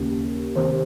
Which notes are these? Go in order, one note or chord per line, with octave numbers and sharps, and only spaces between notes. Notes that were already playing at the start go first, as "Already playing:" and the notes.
Already playing: D#2 C#3
C3 D#3 C5